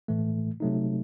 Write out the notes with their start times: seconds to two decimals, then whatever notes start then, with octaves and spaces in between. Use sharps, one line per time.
0.08 A2 E3 A3
0.60 C3 F#3 A3 D#4